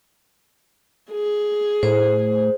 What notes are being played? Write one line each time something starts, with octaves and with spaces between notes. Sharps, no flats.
G#4
A2 C5